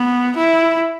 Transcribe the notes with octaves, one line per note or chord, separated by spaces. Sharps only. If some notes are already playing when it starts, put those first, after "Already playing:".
Already playing: B3
E4